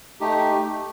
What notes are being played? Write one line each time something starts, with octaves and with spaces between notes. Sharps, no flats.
A3 D#4 G4